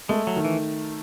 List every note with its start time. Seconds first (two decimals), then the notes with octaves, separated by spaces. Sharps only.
0.09 G#3 A3
0.27 F#3
0.36 D#3
0.45 E3